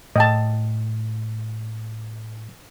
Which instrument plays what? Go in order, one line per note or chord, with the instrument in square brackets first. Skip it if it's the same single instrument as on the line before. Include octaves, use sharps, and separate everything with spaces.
[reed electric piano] A2 [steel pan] D#5 G5 A5